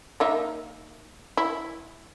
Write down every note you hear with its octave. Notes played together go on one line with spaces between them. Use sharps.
A#3 D#4 E5
E4